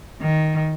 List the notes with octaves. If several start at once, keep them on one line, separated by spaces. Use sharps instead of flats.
D#3